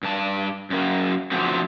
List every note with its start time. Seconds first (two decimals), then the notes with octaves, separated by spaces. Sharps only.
0.03 G2 A5
0.70 F#2 A#3
1.32 B2 D3 F3 F#3 A3 C4